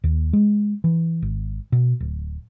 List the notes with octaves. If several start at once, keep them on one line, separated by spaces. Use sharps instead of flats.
D#2
G#3
E3
G#1
B2
D1